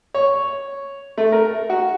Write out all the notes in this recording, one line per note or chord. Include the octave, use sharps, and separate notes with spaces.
C#5
A3
A#4
F#4